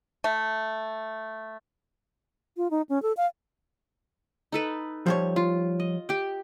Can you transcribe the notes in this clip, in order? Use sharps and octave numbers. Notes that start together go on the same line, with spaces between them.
A3
F4
D#4
C#4
A4
F5
D#4 A4 B4
F3 G3 C#5
F4
D#5
G4 G5